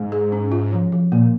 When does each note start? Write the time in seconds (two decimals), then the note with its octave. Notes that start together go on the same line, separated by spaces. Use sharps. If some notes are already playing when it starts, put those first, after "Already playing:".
Already playing: G#2 G#3
0.12 G#4
0.32 C#4
0.52 F4
0.72 F3
0.92 F3
1.12 A#2 A#3